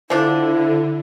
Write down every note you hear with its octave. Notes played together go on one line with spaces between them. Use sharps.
D3 F3 D4 E4